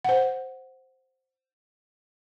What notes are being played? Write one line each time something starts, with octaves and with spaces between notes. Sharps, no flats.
C5 F#5